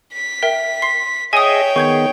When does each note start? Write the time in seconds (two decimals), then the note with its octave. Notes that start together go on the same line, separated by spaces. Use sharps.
0.13 B6
0.42 A#4 E5 G5
0.82 C6 C7
1.33 G#4 C#5 D#5 E5 G5 G#5 D#6
1.76 D#3 B3 G#4 C#6 G6 G#6